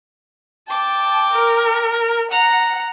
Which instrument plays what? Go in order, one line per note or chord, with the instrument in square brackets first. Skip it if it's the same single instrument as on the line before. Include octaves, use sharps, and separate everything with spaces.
[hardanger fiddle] G5 D6 [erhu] A5
[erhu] A#4
[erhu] F#5 [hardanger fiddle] A#5